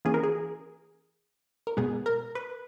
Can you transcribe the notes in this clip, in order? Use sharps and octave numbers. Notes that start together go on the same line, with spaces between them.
E3 A#3 C#4 G#4
A#4
G#4
A#4
B2 G#3 B3 G#4
A#4
B4